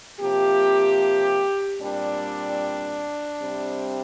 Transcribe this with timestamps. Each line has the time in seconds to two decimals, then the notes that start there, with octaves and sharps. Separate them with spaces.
0.20 C3 F3 A#3 G4
1.81 A#2 G3 C4 D4
3.42 C3 G3 C4